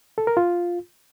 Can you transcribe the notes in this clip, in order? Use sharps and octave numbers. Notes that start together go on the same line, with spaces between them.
A4
A#4
F4